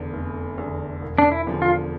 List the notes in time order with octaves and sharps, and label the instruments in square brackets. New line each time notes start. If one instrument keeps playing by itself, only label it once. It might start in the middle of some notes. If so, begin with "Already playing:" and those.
Already playing: [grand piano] F1 E2 D3
F1
E2 D3
E1
[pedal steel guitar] D4
E4
[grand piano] E2 D3 F3
[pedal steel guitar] F4